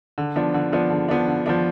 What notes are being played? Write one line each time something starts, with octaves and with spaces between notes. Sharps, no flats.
D3
F3 B3 D4
D3
F3 B3 D4
D3
F3 B3 D4
D3
F3 B3 D4